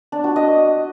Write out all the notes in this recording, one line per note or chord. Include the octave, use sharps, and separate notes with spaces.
D4
F#4
D#5